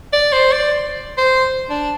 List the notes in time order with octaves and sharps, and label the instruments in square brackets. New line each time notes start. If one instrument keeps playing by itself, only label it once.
[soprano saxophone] D5
C5
D5
C5
D4